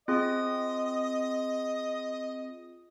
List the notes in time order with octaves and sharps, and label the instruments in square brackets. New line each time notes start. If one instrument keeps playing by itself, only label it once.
[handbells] C4 F4 G#4 [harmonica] D#5